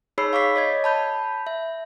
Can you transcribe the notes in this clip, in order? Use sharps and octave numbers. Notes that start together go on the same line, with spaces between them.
D#4 G#4 C#5 B5 E6 C7
F5 C#6 D6 B6 C7
C#5 D#5 G#6
A5 B5 G6
E5